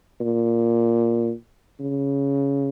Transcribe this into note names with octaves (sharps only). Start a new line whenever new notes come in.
A#2
C#3